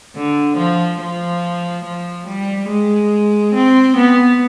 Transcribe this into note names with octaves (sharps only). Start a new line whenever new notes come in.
D3
F3
F3
F3
G3
G#3
C4
B3